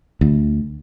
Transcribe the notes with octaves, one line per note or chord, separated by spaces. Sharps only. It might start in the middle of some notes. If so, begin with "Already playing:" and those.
D2